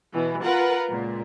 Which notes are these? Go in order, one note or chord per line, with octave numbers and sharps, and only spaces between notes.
B2 E3
F4 A#4 B4 F#5
C#2 A#2